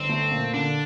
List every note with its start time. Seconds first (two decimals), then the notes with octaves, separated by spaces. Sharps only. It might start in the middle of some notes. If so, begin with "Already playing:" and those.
Already playing: G1 C4
0.09 A3
0.32 A#2
0.54 D3 D4